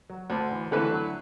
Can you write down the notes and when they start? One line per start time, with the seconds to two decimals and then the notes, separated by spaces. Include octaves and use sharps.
0.10 F#3
0.30 D2 D3
0.51 E3
0.71 D3 E3 A3 E4 B4
0.92 F#3